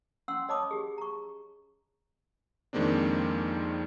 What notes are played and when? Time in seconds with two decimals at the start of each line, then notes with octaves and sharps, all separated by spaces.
0.28 C#4 F#5 C6 E6
0.49 C#5 D#5 A5 B5 D6 D#6
0.71 G4 G#4
0.98 A#5 C#6
2.73 F2 D#3 G#3 A#3 C4 D4